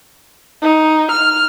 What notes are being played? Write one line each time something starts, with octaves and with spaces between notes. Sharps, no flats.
D#4
F6